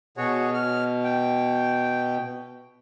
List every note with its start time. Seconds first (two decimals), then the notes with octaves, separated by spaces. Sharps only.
0.17 B2 F#4 G#4 C#5
0.54 F6
1.04 G5